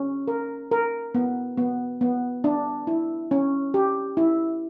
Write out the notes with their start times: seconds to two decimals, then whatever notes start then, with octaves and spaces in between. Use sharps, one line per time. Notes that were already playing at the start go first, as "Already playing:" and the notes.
Already playing: C#4
0.28 A#4
0.71 A#4
1.15 B3
1.57 B3
2.01 B3
2.44 D4
2.87 E4
3.31 C#4
3.74 G4
4.17 E4